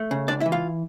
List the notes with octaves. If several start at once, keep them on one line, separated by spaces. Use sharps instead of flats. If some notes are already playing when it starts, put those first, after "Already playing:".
Already playing: A3
C#3
C#2 D4 D5
E4 E5
E3
F4 F5